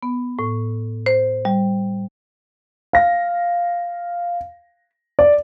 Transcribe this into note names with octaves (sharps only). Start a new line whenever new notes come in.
B3
A2
C5
G3
F5 A#6
D5